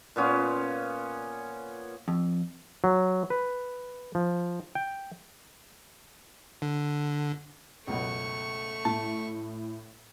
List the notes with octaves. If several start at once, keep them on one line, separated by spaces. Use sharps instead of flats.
A#2 B3 C#4 F4
F2
F#3
B4
F3
G5
D3
C#2 F#2 B2 A3 C#6
A2 A5